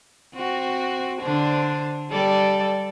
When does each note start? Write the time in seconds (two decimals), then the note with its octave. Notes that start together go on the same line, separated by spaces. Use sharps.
0.35 C4 F#4
1.21 D3 D4 C5
2.11 G3 A4 D5